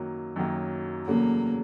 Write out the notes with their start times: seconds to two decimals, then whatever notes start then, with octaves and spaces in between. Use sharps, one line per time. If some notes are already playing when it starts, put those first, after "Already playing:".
Already playing: F#2 D#3 F#3 A#3
0.36 F#2 D#3 F#3 A#3
1.07 E2 C#3 F#3 A3 A#3